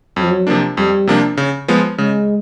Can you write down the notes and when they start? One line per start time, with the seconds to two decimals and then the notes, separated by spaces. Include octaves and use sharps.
0.16 F2 F#3
0.24 F3
0.31 F#3
0.47 C3 F3 A#3 D4
0.77 F2 G3
1.07 C3 F3 A#3 D4
1.37 C#3
1.68 F3 G#3 B3
1.98 C#3 G#3